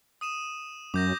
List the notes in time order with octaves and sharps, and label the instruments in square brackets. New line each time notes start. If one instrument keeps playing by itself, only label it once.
[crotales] D#6 D#7 E7
[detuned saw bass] F#2 [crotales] D6 G6 A#6